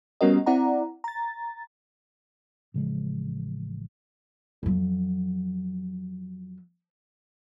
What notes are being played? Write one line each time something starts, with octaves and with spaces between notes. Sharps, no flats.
G3 B3 C#4 F#4 A#4 D#5
C4 E4 D5 F#5 A#5
A#5 A6
A1 C#3 F3 G#3
F2 F#3